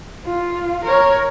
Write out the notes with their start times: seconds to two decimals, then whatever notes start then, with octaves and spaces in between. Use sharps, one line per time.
0.25 F4
0.84 A#4 C#5